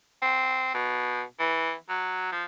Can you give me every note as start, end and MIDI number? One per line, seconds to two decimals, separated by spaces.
0.22 0.70 60
0.74 1.22 47
1.39 1.73 52
1.89 2.27 54
2.32 2.44 53